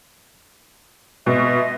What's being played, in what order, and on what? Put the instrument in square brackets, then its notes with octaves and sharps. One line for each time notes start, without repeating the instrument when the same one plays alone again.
[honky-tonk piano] B2 [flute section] D#5 E5 C6